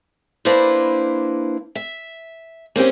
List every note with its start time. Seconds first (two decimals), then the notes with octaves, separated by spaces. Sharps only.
0.45 A#3 D4 E4 B4 C5
1.75 E5
2.76 A#3 C4 C#4 G4